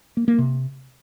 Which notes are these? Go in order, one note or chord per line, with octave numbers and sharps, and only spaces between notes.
A#3
A#3
C3